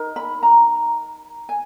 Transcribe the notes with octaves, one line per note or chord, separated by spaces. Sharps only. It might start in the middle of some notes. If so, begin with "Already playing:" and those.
Already playing: D#4 A#4
B5
A#5
G#5